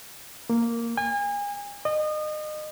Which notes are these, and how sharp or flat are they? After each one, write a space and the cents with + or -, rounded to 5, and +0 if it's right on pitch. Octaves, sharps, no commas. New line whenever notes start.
A#3 -5
G#5 -35
D#5 -30